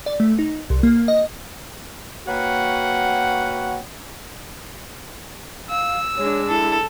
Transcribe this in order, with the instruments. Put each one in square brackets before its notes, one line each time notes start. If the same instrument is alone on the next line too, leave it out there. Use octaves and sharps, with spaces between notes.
[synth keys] D5
A3
D#4
C2
A#3
D#5
[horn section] A#3 F#4 B4 C#5 F#5 G5
[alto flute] F5 [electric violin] E6
[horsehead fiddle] G#3 D4 [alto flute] C#5
[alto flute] E4 [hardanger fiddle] A4